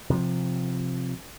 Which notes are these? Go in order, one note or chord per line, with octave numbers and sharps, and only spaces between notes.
C3 F3